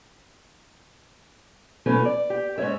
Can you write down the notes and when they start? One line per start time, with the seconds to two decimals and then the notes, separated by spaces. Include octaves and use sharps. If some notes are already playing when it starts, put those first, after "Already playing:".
1.86 B2 E3 F#3 A3 C#4
2.05 D5
2.30 G4
2.58 G#2 C#4 F#4 C#5 E5